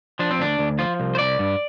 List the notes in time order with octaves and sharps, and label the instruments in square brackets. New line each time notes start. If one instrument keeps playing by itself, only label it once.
[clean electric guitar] F3 D4
C4
D2 D4
D2
F3 F4
C2
C5
C2 D5
G2